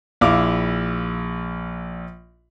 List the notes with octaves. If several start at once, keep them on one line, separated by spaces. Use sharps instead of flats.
A#1 E4 F5 D6